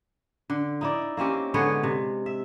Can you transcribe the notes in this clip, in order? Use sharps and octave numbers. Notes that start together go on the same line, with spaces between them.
D3
D#4 E4 D5
A#3 C4 C#4 G4
D3 G#3 B3 C#5
C3
E5